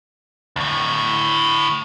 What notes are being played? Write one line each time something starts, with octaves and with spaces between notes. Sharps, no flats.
D2 A2